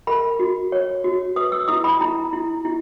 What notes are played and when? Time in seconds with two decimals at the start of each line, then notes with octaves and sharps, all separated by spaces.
0.07 A#4 B5
0.39 F#4
0.72 C#5
1.04 F#4
1.36 B4 D#6
1.52 E6
1.68 E4 D#6
1.84 B5
2.01 E4 A#5
2.33 E4
2.65 E4